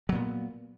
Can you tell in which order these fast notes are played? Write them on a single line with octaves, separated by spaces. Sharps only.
F#3 A#2 B3